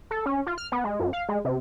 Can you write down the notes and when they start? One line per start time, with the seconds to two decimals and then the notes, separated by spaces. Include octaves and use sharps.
0.11 A4
0.26 C#4
0.46 F4
0.58 F6
0.72 B3
0.84 G#3
1.00 F#2
1.13 F5
1.29 G#3
1.45 C3